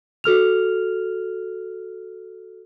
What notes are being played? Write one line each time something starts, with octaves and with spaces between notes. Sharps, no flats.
F#4 A4 F6 F7